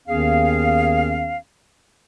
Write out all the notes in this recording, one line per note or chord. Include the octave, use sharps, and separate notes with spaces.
D#2 D#3 B3 C#4 G#4 F5